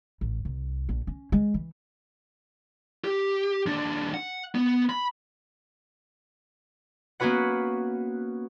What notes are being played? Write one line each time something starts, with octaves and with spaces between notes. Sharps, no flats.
A1
C2
A#1
C#4
G#3
E3
G4
D#2 D4
F#5
B3
B5
A#3 B3 C#4 F#4 B4 F#5